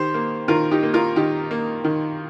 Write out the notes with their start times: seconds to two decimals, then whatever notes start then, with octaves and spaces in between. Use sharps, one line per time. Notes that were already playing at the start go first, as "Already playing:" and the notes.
Already playing: D#3 G4 C5
0.14 A#3
0.48 D#3 F4 A#4
0.71 D#4 G4
0.83 A#3
0.94 F4 A#4
1.16 D#3 D#4 G4
1.51 A#3
1.84 D#3